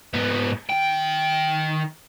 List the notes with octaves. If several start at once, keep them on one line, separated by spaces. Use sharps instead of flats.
G#2 B3
D#3 G5